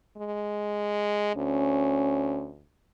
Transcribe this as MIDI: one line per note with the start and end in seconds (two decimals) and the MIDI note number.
0.17 1.31 56
1.36 2.72 38
1.36 2.50 61